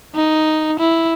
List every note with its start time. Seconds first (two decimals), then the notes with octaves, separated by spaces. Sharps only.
0.15 D#4
0.79 E4